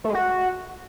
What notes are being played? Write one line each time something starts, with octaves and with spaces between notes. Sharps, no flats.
A3
G#3
F#4